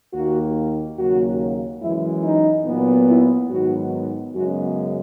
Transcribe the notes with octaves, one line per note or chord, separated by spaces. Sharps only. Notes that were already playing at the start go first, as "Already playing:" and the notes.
D#2 D#3 A#3 F#4
D#2 C#3 F#3 A#3 F#4
F#2 E3 G#3 E4
D#4
A#2 F#3 B3
E4
G#2 D#3 F#3 B3 F#4
F#2 C#3 G#3 B3 F#4